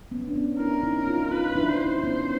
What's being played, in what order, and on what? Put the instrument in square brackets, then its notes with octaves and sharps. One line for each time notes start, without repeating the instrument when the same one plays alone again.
[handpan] B3 C#4
D4
B3 C#4
[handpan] D4 E4 [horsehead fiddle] A#4
[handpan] C#4 D#4
D#4 F4
[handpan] D#4 F4 [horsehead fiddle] B4
[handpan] D4 E4
[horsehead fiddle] C5
[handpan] C#4 D#4
[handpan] B3 C#4 [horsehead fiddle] C5